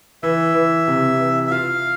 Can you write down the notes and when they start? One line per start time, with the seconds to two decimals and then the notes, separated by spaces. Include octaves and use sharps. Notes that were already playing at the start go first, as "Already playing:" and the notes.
0.23 E3 E5
0.54 E3
0.88 C3
1.20 E3
1.47 E5
1.51 F4 F5